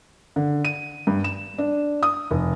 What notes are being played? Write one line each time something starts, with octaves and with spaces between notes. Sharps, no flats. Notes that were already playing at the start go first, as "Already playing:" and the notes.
D3
D#7
G2
E7
D4
D#6
F1